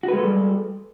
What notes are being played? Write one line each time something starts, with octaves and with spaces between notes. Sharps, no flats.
G3 G#3 F#4 A4 B4